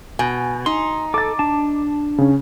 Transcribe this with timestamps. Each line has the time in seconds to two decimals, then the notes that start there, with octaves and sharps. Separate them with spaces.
0.19 B2 G#5
0.66 D#4 C6
1.14 A4 D6 A6
1.39 D4 A5
2.18 C#3 C#4